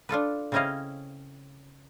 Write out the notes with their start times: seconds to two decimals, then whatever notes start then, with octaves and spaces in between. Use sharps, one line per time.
0.09 D4 F4 A4 B4
0.52 C#3 C4 C#4 E4 D#5 F5